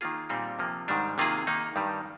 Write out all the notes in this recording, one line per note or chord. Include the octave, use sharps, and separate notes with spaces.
D#3 A#3 F4 G#4
A#2 G3 C4 D#4
C3 F3 A#3
G#2 D#3 G3 D4
C3 D#3 A#3 F4 G#4
D#3 A#3 D#4
G2 D#3 G3